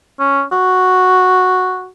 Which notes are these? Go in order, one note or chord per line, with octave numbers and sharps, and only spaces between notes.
C#4
F#4